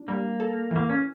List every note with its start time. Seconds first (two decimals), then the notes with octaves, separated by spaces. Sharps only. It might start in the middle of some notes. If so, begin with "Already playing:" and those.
Already playing: D4
0.08 G3 A#3
0.40 A4
0.71 E3 A#3
0.89 C#4